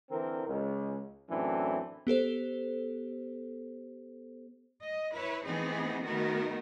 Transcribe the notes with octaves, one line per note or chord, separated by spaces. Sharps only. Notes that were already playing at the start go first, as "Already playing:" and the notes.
D3 E3 C4 A#4
C#2
F#2 A2 E3 C4 D4
B3 G4 A4 C5
D#5
E4 B4 C#5
E3 A3 B3 C4 D#4 G#4
D#3 A3 B3 D#4 F#4 A#4